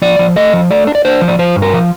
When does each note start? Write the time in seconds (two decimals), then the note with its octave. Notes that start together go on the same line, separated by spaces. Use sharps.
0.02 F3 D5
0.19 F3
0.36 A3 D#5
0.53 F3
0.71 A3 D5
0.87 D4
0.95 D5
1.05 D4 C5
1.22 F3
1.28 D5
1.39 F3 C5
1.56 G2
1.62 A#4
1.74 F3